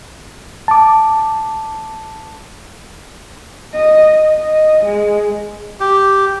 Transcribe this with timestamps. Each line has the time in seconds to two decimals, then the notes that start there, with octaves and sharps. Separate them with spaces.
0.68 A5 D6
3.73 D#5
4.34 D#5
4.84 G#3
5.80 G4